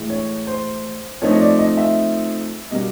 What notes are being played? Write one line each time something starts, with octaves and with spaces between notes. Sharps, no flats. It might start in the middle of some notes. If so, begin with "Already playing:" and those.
Already playing: A2 E3 G#3
C#5
C5
F3 A3 C4 D#4 C#5
D#5
D5
D#5
E5
B2 G3 A#3 D#5